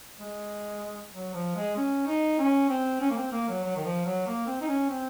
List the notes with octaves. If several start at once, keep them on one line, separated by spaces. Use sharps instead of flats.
G#3
F#3
F3
G#3
C#4
D#4
C#4
C4
C#4
A#3
C4
A#3
F#3
F#3
D#3
F3
F#3
A#3
C4
D#4
C#4
C4